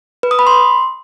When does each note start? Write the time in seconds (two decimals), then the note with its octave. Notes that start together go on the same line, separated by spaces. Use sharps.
0.23 B4
0.31 D#6
0.39 B5
0.47 C6